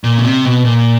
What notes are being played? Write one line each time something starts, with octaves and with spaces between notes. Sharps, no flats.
A#2
C#3
C3
B2
A#2